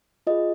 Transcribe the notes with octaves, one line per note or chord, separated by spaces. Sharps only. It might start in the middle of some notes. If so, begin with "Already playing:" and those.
F4 G#4 D#5